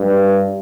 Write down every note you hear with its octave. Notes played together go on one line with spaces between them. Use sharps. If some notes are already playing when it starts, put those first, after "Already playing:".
Already playing: G2